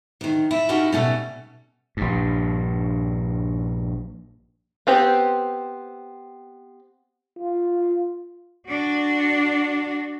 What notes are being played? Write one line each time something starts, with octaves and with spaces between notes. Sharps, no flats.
D2 D#3
E4
C#4 D#4 E4 F#4 G4 A#4
B2 G3 A3 C#4
A#1 G2
B3 C4 G4
F4
D4 F#4